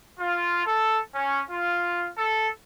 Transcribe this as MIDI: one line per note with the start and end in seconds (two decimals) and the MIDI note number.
0.20 0.62 65
0.65 0.99 69
1.14 1.40 61
1.51 2.09 65
2.17 2.49 69